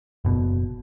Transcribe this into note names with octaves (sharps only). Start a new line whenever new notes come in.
F#1 B2